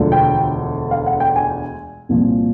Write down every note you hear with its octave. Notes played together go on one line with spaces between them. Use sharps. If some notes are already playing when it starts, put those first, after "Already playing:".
Already playing: E1 D2 D3 F3
G5
F5
F#5
G5
G#5
C2 A#2 F3